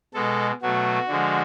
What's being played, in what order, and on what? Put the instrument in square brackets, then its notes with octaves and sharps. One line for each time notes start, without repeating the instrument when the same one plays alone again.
[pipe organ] B2 G#3 A4
B2 F#3 A3 F#4
D3 F3 G#3